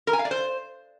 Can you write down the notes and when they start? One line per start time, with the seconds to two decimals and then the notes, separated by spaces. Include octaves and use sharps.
0.07 A#4
0.13 G#5
0.19 F5
0.25 D5
0.31 C5